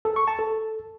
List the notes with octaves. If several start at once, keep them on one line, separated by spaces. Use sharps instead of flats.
A4
C#6
A5
A4